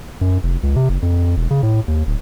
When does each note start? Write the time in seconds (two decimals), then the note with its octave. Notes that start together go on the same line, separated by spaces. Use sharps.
0.21 F#2
0.43 F1
0.63 C#2
0.76 C3
0.89 F#1
1.02 F2
1.37 E1
1.51 C#3
1.63 A2
1.88 D#2
2.07 D1